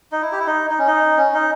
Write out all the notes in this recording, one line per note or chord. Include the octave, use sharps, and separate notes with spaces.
D#4
E4
G4
E4
D#4
D#4
C#4
D#4
C#4
D#4